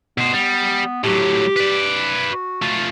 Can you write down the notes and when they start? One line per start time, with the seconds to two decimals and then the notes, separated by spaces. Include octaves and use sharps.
0.18 B2 B3 C5
0.34 G3
1.04 A2 F#3 G4
1.56 B4 D5
2.32 F#4
2.62 A3 F4